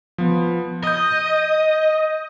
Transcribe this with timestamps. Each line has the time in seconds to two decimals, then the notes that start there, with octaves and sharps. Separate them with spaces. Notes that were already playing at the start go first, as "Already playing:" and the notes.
0.18 F3 B3
0.84 D#5 D#6 G6